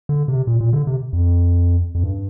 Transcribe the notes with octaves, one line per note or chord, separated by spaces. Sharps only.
D3
C3
A#2
A#2
D3
C3
F2
F2
G2